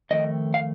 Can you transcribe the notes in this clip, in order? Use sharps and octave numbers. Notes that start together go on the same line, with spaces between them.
F2 D#3 A3 D#5
F5